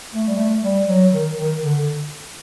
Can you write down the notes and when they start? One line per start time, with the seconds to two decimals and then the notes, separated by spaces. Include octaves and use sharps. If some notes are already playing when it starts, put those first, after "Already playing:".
0.13 A3
0.28 G3
0.38 A3
0.63 G3
0.87 F#3
1.12 D#3
1.37 D#3
1.62 D3